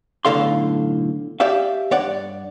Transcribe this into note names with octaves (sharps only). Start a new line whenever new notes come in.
B1 A2 D3 A4 F5 C6
G4 D5 E5 F5
G2 C#5 D5 F#5